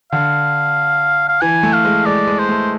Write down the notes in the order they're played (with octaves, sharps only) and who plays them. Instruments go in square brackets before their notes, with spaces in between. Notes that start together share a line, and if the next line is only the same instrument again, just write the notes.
[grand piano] D3 [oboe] F5
[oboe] F5
[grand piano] E3 [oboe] G#5
[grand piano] A3
[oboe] F5
[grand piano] G#3
[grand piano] G#3 [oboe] D5
[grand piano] G#3
[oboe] C5
[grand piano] A3